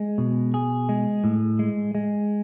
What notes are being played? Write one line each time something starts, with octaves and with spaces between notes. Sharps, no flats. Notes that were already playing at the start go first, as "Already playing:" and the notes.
Already playing: G#3
B2
G#4
G#3
A2
G#3
G#3